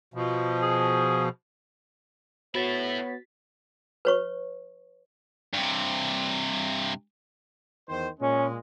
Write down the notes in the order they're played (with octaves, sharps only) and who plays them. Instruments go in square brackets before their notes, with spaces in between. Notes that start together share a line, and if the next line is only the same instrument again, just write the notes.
[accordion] B2 F3
[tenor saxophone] G#4
[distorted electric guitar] A2 E4 [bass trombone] B3 [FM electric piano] F#4 A6 B6 [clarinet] C#5
[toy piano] B4 C#5 C#6
[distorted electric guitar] G2 C3
[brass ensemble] E2 D#3 C5
[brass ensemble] A#2 G#3 [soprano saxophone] C#4